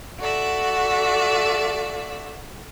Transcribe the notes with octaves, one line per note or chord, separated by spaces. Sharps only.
F#4 A4 D5 E5